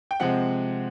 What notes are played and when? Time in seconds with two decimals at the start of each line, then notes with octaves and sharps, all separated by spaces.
0.11 G5
0.20 C3 F3 G#3 C4 F#5